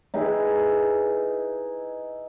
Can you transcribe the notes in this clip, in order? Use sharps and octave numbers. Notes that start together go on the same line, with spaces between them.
D#4 E4 G#4 B4